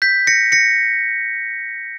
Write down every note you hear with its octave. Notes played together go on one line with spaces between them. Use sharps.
G6 B6
A#6 C#7
A#6 C#7